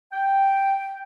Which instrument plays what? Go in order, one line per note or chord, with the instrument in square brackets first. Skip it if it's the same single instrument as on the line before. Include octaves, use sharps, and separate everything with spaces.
[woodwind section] G5